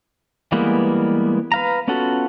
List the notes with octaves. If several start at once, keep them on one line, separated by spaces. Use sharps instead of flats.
E3 G3 G#3 A#3 B3
B4 F5 A#5
B3 C#4 F4 F#4 A4